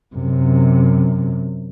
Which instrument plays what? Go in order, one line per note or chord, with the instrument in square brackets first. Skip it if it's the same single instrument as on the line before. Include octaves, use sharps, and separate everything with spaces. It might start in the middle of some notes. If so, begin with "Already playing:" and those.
[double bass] F#2 C3